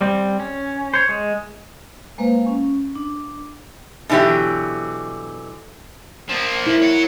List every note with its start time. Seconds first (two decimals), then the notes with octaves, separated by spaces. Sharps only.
0.01 G3 C4
0.40 C#4
0.94 C5 C#5
1.09 G#3
2.18 G#3 A#3 B4 C5 F5
2.46 C#4
2.96 D4
4.09 B2 D3 E3 F#3 G4
6.29 F3 A#3
6.67 E4 A#4
6.82 C#5 F#5